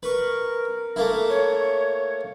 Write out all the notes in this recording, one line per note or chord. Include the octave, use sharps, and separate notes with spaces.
A#4 B4 C#6
A3 A#3 E4
C#5